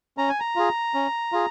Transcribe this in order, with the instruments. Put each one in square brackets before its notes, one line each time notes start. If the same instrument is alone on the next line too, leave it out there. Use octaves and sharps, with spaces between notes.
[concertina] C#4 A#5
G#5
A#5
F4 G#4
C#4
F4 G#4